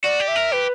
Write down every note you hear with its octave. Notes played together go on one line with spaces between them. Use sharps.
F#4 D5
G4
E5
A#4
G4 B4